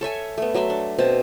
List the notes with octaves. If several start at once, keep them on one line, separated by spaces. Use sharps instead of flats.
A4 C#5 E5 G#5
A3 B3
F#3 A3 E5 C6
D4
B2 C4 A5